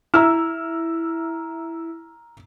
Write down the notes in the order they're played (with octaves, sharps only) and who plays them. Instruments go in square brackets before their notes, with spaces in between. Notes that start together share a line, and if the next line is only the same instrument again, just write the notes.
[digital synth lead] E4 [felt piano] A#5 E6 F6